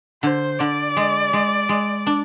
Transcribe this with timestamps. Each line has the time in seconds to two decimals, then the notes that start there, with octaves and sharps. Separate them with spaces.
0.23 D3 C5
0.59 D3 D5
0.97 G#3
1.33 G#3
1.69 G#3
2.06 D4